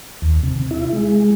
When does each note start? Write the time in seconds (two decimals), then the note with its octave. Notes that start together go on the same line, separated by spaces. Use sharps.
0.22 D#2
0.43 C3
0.71 E4
0.93 G#3